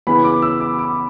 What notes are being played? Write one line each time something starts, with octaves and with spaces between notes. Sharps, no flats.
C#3 E3 B3 B5
D6
E6
D6
D6